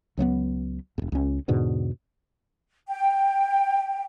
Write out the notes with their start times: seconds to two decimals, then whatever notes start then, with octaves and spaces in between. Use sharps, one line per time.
0.17 C#2 F#3 A3 B3
0.98 E1 E2
1.12 C#2 C#4
1.48 E2 G#2 B2 D3
2.88 G5